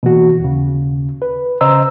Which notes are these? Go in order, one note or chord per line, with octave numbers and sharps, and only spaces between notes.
B2 E3 A#3 F#4
D#2 C#3
B4
C#3 C5 D#5 A#5 E6